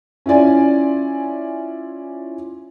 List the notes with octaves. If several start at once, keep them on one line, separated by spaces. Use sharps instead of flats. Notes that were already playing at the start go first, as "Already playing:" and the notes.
C#4 E4 F4 D5 G#5